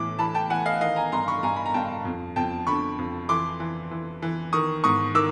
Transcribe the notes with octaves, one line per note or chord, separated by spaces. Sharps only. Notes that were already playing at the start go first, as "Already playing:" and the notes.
Already playing: A2 E3 D6
E3 A5 B5
G5 A5
E3 F#5 G#5
D#5 F5
D#3 D#5 F5
G#5 A#5
G2 A#5 C6
B5 C#6
G2 G#5 A#5
B5
A#5
G2 G5 A5
F2
F2 G5 A5
D3 B5 C#6
F2
E3 C6 D6
E3
E3
E3
D#3 C#6 D#6
G#2 C#6 D#6
D#3 D6 E6